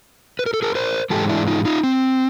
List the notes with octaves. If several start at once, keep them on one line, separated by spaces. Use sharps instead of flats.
B4
A#4
A4
G#4 A#4
A#4 C5
G#2 E3 G#3 G4 A4
D4 E4
D#4 F4
D#4 F4
C4